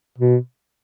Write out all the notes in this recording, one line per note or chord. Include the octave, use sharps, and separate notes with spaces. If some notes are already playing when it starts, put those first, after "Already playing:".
B2